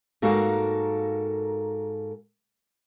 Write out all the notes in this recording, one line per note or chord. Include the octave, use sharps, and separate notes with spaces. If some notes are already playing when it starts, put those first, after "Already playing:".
G#2 A#3 F#4 A4 A#4 F5